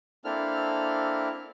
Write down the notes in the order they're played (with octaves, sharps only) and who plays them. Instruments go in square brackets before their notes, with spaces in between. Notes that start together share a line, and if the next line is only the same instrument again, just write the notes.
[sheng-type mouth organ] A#3 C4 D4 E4 A4 F6